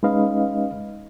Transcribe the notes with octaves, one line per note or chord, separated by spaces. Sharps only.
G#3 C#4 D#4 B4 D#5 F5